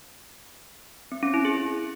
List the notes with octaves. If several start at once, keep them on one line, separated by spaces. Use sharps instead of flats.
C4
C#4
E4
G#4